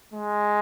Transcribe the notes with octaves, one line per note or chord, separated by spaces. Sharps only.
G#3